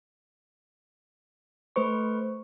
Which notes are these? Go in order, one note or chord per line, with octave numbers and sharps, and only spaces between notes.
A3 B4 C5 C#6